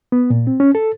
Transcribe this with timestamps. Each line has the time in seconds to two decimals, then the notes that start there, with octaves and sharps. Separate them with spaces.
0.12 B3
0.30 A#2
0.47 C4
0.60 C#4
0.75 A4